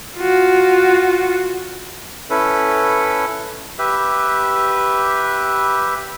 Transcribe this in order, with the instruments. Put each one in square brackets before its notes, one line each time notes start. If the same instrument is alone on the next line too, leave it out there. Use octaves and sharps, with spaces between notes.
[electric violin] F4 F#4
[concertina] C#4 E4 A4 B4
[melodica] G4 B4 E5